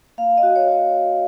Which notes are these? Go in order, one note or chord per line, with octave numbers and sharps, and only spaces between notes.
A#3 F5
D#5
F#4
C#5
F#4